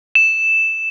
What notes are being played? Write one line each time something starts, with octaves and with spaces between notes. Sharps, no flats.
E7